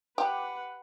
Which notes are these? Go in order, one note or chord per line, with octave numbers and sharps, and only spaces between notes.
G4 B4 F#5